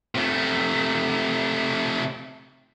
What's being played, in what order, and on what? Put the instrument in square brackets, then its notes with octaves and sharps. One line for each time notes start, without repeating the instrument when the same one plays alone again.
[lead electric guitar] C3 A3